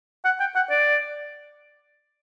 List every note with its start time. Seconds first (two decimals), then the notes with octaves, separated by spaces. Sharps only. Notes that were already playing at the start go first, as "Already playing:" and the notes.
0.25 F#5
0.40 G5
0.56 F#5
0.70 D5